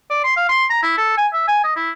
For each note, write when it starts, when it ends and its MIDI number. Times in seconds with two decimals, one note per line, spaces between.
0.10 0.21 74
0.24 0.32 84
0.36 0.44 77
0.49 0.64 84
0.70 0.82 82
0.83 0.97 64
0.98 1.14 69
1.17 1.27 80
1.33 1.46 76
1.48 1.61 80
1.64 1.73 75
1.76 1.90 64